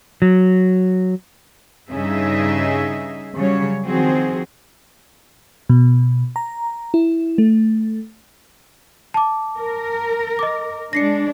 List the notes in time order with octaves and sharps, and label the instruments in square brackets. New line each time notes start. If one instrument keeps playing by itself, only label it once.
[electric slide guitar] F#3
[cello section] G2 C#3 D#4 G#4 D#5 E5
C#3 F#3 G3 C#5
D#3 F3 C4 F#4 G#4
[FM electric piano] B2
A#5
E4
A3
[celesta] A5 D6
[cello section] A#4
[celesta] D#5 D6
[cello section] G#3 D4 [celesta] A#6 C7 C#7